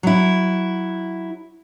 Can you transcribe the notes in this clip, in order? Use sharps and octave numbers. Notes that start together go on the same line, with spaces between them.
F#3 E4